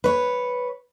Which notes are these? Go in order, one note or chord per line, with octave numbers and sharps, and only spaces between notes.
B4 C#5